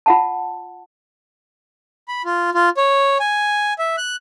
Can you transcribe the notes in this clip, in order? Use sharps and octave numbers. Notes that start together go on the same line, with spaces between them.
F4 F#5 A5
B5
F4
F4
C#5
G#5
E5
F#6